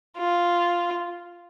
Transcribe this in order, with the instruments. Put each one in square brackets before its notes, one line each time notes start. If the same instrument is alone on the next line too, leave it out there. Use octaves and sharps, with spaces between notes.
[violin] F4